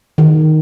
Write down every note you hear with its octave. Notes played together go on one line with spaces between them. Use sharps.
D#3